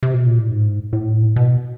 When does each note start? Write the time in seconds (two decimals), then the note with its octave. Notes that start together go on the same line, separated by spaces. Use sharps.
0.03 C3
0.14 B2
0.26 A#2
0.39 A2
0.50 G#2
0.93 A2
1.36 B2